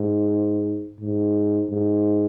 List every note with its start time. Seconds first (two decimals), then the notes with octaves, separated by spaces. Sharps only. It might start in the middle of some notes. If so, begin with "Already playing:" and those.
Already playing: G#2
1.00 G#2
1.70 G#2